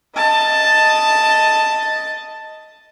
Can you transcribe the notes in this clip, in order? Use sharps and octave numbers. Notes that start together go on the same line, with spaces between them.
D#5 A5